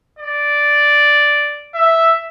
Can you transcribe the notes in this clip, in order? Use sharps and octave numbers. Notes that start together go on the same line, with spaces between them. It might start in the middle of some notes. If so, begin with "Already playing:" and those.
D5
E5